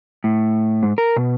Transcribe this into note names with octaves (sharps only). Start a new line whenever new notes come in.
A2
G#2
A#4
B2